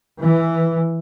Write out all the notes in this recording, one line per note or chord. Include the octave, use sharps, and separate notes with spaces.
E3